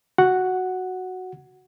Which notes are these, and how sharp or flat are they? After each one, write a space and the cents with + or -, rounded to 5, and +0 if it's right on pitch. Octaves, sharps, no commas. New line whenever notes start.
F#4 +0 F#5 +0